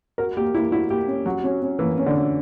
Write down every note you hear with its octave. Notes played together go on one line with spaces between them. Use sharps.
F#4 A#4
A#3 G4
A#3 E4
E4 F#4
A#3 G4
C#4
F#3 F#4
C#4
C#4
E3 A#3
C#4
D3
C#4